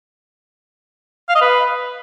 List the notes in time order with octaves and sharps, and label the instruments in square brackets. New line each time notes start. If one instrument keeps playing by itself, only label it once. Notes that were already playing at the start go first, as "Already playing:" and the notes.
[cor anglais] F5
D#5
B4